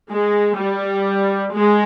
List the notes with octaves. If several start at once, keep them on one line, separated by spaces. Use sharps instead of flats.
G#3
G3
G#3